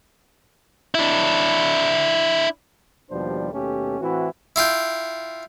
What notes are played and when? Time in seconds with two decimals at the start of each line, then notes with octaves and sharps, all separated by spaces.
0.95 D4 E4
3.10 D#2 B2 F3 G3 D4 C5
3.52 D#2 B2 A3 C#4 G4 A4
4.00 A2 E3 C4 E4 F#4
4.56 E4 F4 G5